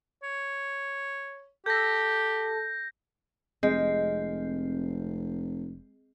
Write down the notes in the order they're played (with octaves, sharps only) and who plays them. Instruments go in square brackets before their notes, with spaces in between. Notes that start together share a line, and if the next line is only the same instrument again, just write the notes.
[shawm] C#5
[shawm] G4 [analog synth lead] A4 [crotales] G6 A#6
[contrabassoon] F1 [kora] G#3 [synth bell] C4